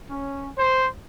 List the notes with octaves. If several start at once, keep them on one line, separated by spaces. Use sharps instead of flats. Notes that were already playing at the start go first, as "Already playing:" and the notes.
C#4
C5